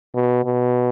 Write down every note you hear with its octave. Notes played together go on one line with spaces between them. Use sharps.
B2
B2